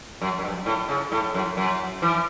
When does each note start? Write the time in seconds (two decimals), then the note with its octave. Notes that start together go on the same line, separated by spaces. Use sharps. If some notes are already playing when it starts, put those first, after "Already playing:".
0.22 F#2
0.39 F#2
0.45 G2
0.66 A2
0.89 C#3
1.12 A2
1.34 F#2
1.57 F#2
2.02 E3